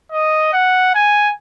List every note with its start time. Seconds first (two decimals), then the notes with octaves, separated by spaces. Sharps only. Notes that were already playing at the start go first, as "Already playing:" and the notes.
0.12 D#5
0.53 F#5
0.94 G#5